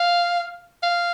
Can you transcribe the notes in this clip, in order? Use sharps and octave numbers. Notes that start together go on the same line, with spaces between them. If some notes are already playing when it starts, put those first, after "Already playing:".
Already playing: F5
F5